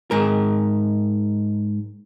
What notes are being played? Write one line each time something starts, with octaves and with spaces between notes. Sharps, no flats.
G#2 A#4